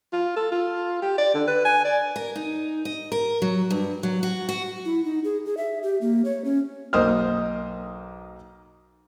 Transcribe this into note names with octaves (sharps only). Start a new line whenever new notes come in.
F4
A4
F4
G4
D5
D3
B4
G#5
D5
A#4
D#4
D#5
A#4
F#3
G2
F#3
F#4
F#4
E4
D#4
G#4
G#4
E5
G4
A#3
C#5
C#4
B1 A#3 D#4 C5 D#6 F6